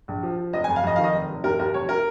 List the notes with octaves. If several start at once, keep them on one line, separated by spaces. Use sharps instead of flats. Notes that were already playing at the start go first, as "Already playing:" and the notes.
A#1
F3
F3
F1 D#5
G#5
F2
F5
F2 D#5
D#3 F5
D#5
F1
F1
D#2 A#4
D#2 A#4
F1 C#5
A#4